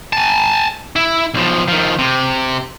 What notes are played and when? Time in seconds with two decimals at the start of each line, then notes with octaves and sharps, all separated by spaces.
0.13 G#5 A5
0.96 E4
1.34 B1 F3
1.68 D#3 F3
1.99 C3